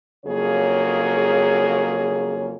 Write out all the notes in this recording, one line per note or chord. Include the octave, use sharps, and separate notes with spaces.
F2 C#3 F#3 A#3 G#4 C#5